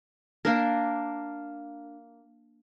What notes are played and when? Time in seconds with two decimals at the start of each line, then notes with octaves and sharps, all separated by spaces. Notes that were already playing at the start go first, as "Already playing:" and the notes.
0.45 A#3 D4 A#4